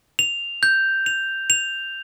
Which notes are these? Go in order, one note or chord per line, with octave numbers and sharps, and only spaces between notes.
F7
G6
F7
F7